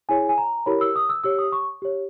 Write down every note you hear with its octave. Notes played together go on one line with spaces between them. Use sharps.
E4 G#4 C#5 G#5
G#5
A#5
E4 G4 A#4 C#5 B5
E6
D#6
E6
G4 C#5 E6
D#6
C#6
G4 C#5